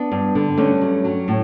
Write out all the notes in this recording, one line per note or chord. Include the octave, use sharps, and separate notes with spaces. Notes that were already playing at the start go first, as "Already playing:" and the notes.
Already playing: B3 D4
G2
D3
G2 A3 C#4
F#3
F#3
A2